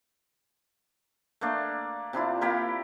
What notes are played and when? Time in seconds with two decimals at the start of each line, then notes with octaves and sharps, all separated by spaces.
1.41 A3 A#3 D4
2.13 C3 D4 E4 F4
2.41 A#3 E4 G4 A#4